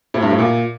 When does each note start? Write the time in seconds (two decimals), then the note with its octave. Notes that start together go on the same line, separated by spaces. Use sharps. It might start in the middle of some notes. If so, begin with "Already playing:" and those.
0.14 A2
0.22 G2
0.30 A2
0.39 A#2